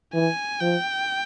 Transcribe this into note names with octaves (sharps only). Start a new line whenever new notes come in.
E3 G#5
F3 G5